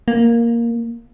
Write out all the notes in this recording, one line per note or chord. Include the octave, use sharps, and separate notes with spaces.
A#3